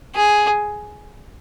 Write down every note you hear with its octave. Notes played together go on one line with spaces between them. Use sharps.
G#4